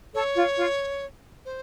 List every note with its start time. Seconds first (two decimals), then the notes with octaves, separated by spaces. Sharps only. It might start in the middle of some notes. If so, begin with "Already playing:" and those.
0.14 A4 C#5
0.36 F4
0.58 F4
1.45 C5